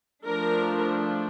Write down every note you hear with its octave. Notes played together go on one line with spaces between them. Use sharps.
F3 A3 D4 A#4